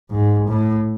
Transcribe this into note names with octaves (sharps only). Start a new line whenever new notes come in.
G#2
A2